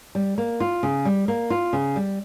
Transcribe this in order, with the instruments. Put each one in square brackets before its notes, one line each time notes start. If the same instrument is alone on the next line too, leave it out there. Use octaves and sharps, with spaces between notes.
[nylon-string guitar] G3
A#3
F4
C#3
G3
A#3
F4
C#3
G3